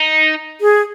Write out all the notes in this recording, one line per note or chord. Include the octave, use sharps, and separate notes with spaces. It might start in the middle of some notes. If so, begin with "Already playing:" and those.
Already playing: D#4
G#4